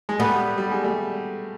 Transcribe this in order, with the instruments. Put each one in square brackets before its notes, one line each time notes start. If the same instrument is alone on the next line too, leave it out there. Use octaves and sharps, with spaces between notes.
[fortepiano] G#3
[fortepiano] G3 A3 [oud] B3
[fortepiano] G3
G#3
G3 A3